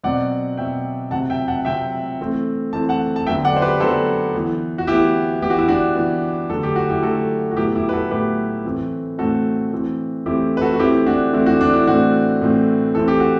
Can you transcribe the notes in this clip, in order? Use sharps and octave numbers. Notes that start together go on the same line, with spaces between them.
B2 F#3 C4 D5 F#5
B2 F#3 C4 E5 G5
C3 F#3 C4 F#5 A5
E5 G5
F#5 A5
C3 F#3 C4 E5 G5
E3 A3 C4
E3 A3 C4 A5
F#5 A5
A5
D3 F#3 B3 E5 G5
D5 F#5
C5
G4 B4
D3 F#3 B3 A4 C5
E3 B3
F#4
E3 B3 E4 G4
E3 B3 G4
F#4
E4
D4 F#4
E3 B3
D3 F#3 A3 A4
G4
F#4
E4 G4
D3 F#3 A3 F#4 A4
F#4
A2 F#3 B3 E4 G4
E4 G4
B4
F#4 A4
A2 F#3 B3 G4 B4
A2 E3 A3 C4
A2 E3 A3 C4 F#4 A4
E3 A3 C4
E3 A3 C4 E4 G4
B4
F#4 A4
F#4
E3 A3 C4 E4 G4
D4 F#4
E3 A3 C4 E4
D4 F#4
D4
E4
A2 E3 A3 C4 D4 F#4
A2 E3 A3 C4
E3 A3 C4 A4
G4
F#4